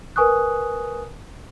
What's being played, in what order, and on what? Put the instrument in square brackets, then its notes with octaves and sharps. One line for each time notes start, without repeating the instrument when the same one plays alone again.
[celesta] A#4 B4 G#5 C#6 D#6 F#6